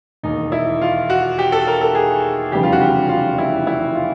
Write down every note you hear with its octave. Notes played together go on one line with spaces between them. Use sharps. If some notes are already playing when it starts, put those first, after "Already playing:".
E1 D#2 D#3 D#4
E4
F4
F#4
G4
A4
A#4
A4
G#4
F1 E2 C#3 E3 G3 G4
F4
F#4
G4
F4
E4
E4
F4